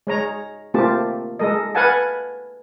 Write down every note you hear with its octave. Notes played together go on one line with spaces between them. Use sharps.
G#3 C#5 A#5
A3 A#3 C4 F4 G4 A5
G#3 A4 A#4 D#5
B4 F5 F#5 G#5 A5